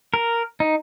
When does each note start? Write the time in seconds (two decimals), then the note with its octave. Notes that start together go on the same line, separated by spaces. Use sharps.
0.14 A#4
0.60 D#4